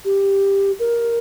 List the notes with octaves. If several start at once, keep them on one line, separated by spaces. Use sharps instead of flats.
G4
A#4